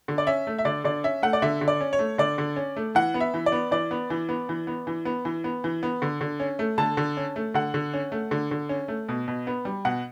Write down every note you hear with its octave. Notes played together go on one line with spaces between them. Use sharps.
D3
D5
C#4 E5
A3
E5
D3 D5
D3 D5
C#4 E5
A3 F#5
D5
D3 E5
D3
D5
C#4
C#5
A3
D3 D5
D3
C#4
A3
E3 F#5
B3
E5
E3
D5
B3
E3 D5
B3
E3
B3
E3
B3
E3
B3
E3
B3
E3
B3
D3
D3
C#4
A3
D3 A5
D3
C#4
A3
D3 F#5
D3
C#4
A3
D3
D3
C#4
A3
B2
B2
B3
G3
B2 F#5